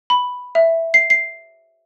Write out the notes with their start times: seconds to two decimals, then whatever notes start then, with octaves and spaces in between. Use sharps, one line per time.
0.10 B5
0.55 E5
0.94 C7
1.10 C7